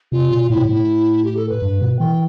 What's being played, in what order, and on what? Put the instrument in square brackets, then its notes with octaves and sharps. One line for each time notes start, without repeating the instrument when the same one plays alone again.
[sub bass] C3 [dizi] F4
[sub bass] B2
[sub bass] A2 [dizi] E4
[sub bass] B2
[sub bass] A2 [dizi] E4
[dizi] G4
A4
B4
[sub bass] G2
B2
[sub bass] E3 [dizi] G5